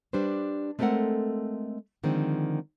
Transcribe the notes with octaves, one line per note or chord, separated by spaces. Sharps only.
G3 D4 B4 C5
G#3 A3 C4 A4 A#4 F#5
D3 D#3 F3 G#3 C4